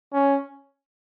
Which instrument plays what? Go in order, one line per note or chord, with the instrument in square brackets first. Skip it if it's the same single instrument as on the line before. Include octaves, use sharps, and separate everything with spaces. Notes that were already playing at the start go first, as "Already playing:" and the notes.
[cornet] C#4